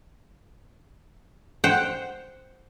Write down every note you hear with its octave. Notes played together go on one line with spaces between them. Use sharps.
C5 F#5 G5